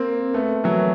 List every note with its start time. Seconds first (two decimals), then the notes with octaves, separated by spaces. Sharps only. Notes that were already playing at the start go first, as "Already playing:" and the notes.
Already playing: A#3 C4
0.34 A3 B3
0.64 E3 F#3